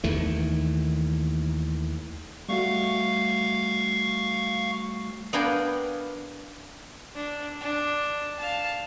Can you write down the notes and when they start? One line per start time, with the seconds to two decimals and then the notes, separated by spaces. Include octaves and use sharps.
0.04 D#2 D#3 E3 A3
2.49 G3 A3 F#4 F5 C#6
5.33 B3 D4 A#4 F5 G5 G#5
7.15 D4
7.61 D4
8.39 F5 A5